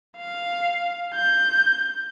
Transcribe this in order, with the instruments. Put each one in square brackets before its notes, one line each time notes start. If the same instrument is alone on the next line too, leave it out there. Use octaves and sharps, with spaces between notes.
[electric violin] F5
G6